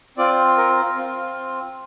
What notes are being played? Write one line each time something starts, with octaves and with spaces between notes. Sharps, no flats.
C4 F4 D5
A#4
C4 F4